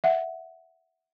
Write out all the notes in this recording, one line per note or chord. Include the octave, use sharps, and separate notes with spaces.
E5 F#5